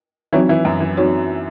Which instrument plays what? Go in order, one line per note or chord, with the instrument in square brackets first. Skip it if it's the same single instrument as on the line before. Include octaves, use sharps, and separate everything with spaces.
[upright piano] E3 E4 [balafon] F#3 C4 D#4 F#4 C#5
[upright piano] E3 E4
F#2 F#3
E3
[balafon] F#3 C4 D#4 F#4 C#5